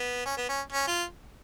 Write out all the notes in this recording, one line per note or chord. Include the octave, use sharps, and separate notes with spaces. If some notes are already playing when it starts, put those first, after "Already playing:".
Already playing: B3
C#4
B3
C#4
C#4
F4